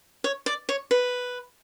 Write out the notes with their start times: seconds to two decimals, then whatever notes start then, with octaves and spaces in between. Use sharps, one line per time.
0.24 C#5
0.46 D5
0.69 C#5
0.91 B4